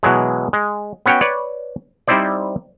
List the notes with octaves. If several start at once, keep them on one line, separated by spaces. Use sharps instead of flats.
B2 E3 F#3 G#3
G#3
B3 C#4 F#4 C#5 G5
B4 C#5 D5
G3 C4 D#4 E4 C5 D5